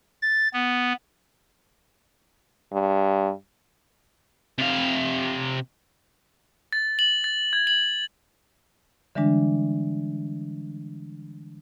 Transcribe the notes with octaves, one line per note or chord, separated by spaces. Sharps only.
A6
B3
G2
C3 F5
A6
F#7
A6
G#6
F#7
D3 E3 G3 G#3 D4